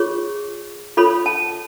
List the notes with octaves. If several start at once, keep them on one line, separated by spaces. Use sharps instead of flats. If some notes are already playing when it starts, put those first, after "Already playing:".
Already playing: F4 G#4 C#5 C#6
F4 A4 C#5 B5
A5